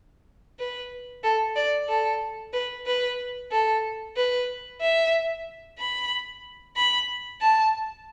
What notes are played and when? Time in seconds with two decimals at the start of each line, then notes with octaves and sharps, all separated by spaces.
0.59 B4
1.23 A4
1.56 D5
1.89 A4
2.53 B4
2.87 B4
3.51 A4
4.16 B4
4.81 E5
5.79 B5
6.76 B5
7.41 A5